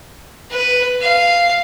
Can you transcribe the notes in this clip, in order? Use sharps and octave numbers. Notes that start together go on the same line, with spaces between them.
B4
F5